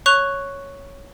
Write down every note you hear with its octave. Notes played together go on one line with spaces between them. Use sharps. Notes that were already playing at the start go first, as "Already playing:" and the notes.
C#5 C#6 F#6 F7